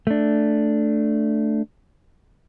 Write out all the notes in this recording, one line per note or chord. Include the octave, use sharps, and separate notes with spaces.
A3 D4